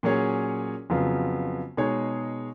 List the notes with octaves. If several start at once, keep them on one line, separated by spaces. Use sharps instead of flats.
A#2 F#3 C#4 G#4 C#5
F2 C#3 F#3 B3 F4
B2 G#3 D#4 G#4 C#5